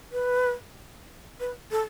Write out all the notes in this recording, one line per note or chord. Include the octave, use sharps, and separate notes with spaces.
B4
B4
A4